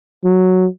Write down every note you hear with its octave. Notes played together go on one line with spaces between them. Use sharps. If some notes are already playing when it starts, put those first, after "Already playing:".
F#3